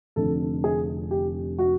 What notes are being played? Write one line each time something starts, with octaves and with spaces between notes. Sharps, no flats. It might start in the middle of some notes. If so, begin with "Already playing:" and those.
F1 F2 D3 A4
G#4
G4
F#4